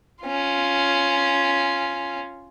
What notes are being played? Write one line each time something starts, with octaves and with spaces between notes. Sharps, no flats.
C#4 F4